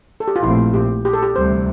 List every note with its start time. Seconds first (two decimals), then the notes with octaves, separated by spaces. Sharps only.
0.20 A4
0.28 G4
0.36 F4
0.43 A#1 A#2 A3 C4 E4
0.74 G4
1.05 G4
1.13 A4
1.23 G4
1.36 D2 C3 E3 G3 C5